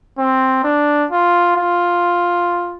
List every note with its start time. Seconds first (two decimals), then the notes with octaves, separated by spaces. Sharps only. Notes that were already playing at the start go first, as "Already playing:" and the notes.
0.18 C4
0.64 D4
1.11 F4
1.56 F4